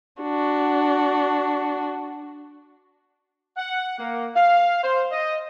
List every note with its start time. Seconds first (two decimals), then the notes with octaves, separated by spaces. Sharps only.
0.21 D4 F#4
3.57 F#5
3.99 A#3
4.36 F5
4.84 C5
5.12 D#5